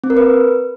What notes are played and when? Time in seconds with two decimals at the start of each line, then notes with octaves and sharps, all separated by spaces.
0.04 C4
0.10 A#4
0.17 B4